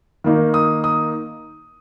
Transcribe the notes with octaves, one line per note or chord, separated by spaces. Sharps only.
D#3 A#3 D#4
D#6
D#6